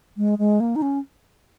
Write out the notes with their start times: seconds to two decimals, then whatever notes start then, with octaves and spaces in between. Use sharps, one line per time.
0.17 G#3
0.39 G#3
0.60 A#3
0.76 D#4
0.82 C#4